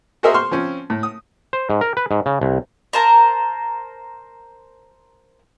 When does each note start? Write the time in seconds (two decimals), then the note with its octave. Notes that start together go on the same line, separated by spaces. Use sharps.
0.23 F#4 G#4 A#4 C5 D#5 E5
0.34 C5 C6 C#6 F6
0.51 F3 C4 C#4
0.90 A2
1.03 D#6
1.53 C5
1.70 G#2
1.81 A#4
1.97 B4
2.11 G#2
2.26 C#3
2.41 C2
2.93 A#4 C5 A5 A#5